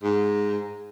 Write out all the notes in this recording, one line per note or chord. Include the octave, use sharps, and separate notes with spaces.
G#2